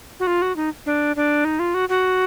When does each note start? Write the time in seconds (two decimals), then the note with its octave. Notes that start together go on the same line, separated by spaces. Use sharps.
0.20 F#4
0.27 F4
0.42 F#4
0.56 D#4
0.86 D4
1.16 D4
1.45 D#4
1.59 F4
1.74 F#4
1.89 F#4